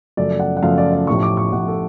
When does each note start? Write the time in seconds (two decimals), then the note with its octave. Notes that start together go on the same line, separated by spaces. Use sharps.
0.17 F#2 C#3 F3 A3 D5
0.40 F#5
0.57 F#5
0.62 F#2 C#3 F3 A3 F5
0.78 D5
0.93 D5
1.07 A1 A2 F3 C#6
1.23 D6
1.37 C#6
1.52 A1 A2 F3 F#5
1.68 A4